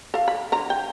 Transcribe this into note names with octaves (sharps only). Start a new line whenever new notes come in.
A4 F5
B5
D3 F#3 A#5
G5